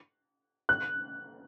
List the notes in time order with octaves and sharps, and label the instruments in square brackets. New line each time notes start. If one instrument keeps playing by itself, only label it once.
[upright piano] F#6